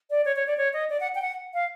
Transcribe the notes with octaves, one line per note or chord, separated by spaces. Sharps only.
D5
C#5
C#5
D5
C#5
D#5
D5
F#5
G5
F#5
F5